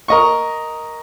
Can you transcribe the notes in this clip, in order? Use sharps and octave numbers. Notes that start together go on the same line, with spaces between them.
A#4 D#5 C#6